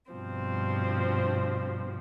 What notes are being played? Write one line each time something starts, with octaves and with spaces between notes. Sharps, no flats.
G2 B2 F3 C4